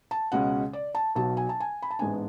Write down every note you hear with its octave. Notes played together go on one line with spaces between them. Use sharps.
A5
C#2 B2 G#3 C#4 F#5
D5
A5
B1 B2 F#3 A5
G#5
A5
G#5
B5
A5
A1 G#2 G#3 B3 D4 G#5